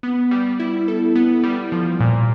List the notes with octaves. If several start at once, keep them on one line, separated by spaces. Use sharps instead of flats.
B3
G3
E4
A4
B3
G3
F3
A#2